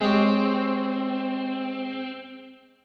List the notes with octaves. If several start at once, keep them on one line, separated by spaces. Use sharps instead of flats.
G#3 C4 G4 C#5